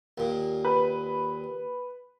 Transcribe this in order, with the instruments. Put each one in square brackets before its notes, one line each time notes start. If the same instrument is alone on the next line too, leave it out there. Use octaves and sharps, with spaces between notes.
[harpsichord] D#2 A#2
[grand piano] B4